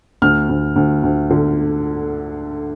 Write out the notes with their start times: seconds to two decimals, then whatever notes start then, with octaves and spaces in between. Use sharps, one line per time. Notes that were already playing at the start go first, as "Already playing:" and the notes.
0.22 D2 F6
0.49 D2
0.76 D2
1.03 D2
1.31 D3